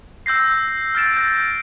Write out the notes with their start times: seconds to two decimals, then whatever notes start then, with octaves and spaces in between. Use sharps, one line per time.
0.26 E6 G6 A#6 C7
0.95 F6 G6 A6 D7 E7
1.17 G6 A#6